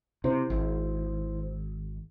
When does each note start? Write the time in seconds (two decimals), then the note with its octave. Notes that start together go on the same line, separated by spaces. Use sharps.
0.24 C3 E4 C5
0.50 G#1